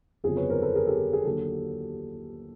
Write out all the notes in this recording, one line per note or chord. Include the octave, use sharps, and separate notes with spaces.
G1 F2 C#3 F#3 B3 G#4
B4 C#5
A#4 C5
A4 B4
G#4 A#4
G4 A4
G#4
D#2 D3 F#3 G4 A4